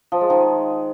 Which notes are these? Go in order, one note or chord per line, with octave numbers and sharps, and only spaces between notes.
F3
G#3
D#3